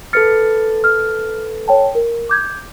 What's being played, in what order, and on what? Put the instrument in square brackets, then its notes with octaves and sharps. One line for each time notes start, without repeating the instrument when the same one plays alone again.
[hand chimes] A4 B4 A6 [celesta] F6 C#7
[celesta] F6
C#5 G5 A5
A#4
D6 G6 G#6